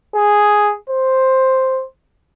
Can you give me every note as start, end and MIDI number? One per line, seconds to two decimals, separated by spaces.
0.15 0.73 68
0.89 1.85 72